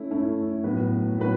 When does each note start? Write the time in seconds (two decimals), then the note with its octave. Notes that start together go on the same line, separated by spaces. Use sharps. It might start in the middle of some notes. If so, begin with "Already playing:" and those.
Already playing: A3 C#4 E4 A4
0.11 A3 C#4 E4 A4
0.64 A2 F#3 B3 F#4 B4
1.17 A2 F#3 B3 F#4 B4